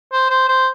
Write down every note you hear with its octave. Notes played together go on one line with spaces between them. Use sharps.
C5
C5
C5